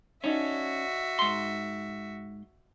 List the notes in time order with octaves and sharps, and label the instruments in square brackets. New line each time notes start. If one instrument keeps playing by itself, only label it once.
[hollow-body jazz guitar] C#4 [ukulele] D#4 D5 A5 [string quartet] F#4 E5
[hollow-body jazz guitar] G#2 C6